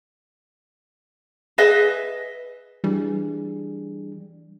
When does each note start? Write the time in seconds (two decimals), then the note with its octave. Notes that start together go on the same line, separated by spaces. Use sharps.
1.58 G#4 B4 D#5 E5
2.84 E3 G3 D4 G#4